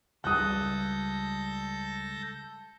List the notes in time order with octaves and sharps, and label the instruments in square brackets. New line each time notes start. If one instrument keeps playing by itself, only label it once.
[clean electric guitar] C#2 G3 [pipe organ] A4 G6 A#6 [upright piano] D#6 F#6